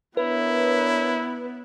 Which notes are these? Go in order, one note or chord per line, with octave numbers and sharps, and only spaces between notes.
B3 D4 E4 A#4 B4 C#5